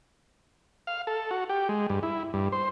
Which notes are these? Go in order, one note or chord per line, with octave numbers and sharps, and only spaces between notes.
F5
A4
F#4
G4
G#3
G2
E4
G2
C5